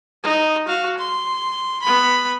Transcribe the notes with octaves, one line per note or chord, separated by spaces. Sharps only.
D#4
F#4 F5
C6
B3 B5